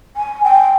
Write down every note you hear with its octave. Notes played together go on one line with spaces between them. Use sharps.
G#5
G5